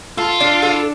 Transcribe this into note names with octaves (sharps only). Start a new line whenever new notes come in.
F4 A4
D4
A4